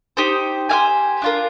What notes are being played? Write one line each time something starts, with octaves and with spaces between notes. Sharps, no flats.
D#4 G4 C5
G4 C5 F5 G#5
D4 F4 A#4